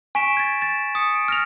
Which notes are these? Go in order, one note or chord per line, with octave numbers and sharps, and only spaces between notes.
G#5 C#6 B6 D7 E7
G#6 A6
A6 E7
D#6 C#7
D7
F6 A#6 F7